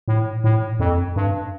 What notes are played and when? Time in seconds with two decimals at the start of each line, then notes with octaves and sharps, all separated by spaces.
0.08 A2
0.44 A2
0.80 F2
1.16 G2